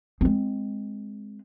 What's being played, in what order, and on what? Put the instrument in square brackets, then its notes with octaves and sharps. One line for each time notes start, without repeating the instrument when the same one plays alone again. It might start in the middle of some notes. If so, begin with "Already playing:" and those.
[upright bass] G#3 C4